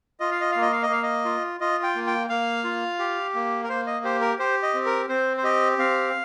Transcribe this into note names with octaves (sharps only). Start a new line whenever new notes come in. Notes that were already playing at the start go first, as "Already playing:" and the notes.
F4 D#5
F5
D#5
A#3 F5
D#5
F5
D#5
A#3 F5
D#5
F4
F4 D#5
G5
A#3
G5
A#3 F5
F4
G4
A#3
A#4
A#3 C5
D#5
G4 C5
A#4
G4 C5
D#5
C4
A#4
C4 C5
C5
G4 D#5
C4 F5